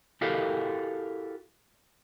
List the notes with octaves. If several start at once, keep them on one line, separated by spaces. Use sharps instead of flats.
E4 F#4 G4 A4 A#4 F5